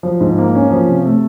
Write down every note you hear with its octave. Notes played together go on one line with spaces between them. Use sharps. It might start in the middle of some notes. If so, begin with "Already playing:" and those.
F3
G#2
A#3
C#4
F3
C3
A3